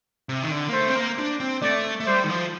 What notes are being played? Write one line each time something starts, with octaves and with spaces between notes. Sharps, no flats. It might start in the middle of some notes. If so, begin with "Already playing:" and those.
C3
D#3
D3
A#3
A3 C5
C4
A#3
D4
C4
A3 D5
A3
G3 C5
D#3
F3